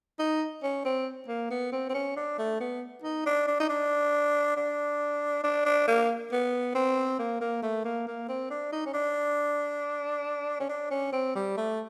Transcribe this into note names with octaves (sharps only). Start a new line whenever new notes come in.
D#4
C#4
C4
A#3
B3
C4
C4
C#4
D4
A3
B3
D#4
D4
D4
D#4
D4
D4
D4
D4
A#3
B3
C4
A#3
A#3
A3
A#3
A#3
C4
D4
D#4
C#4
D4
C#4
D4
C#4
C4
G3
A3